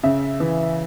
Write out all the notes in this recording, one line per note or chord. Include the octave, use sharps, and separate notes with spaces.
C#3 E5
E3